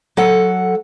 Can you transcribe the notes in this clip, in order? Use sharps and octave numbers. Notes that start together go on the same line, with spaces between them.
F#3 A4 F#5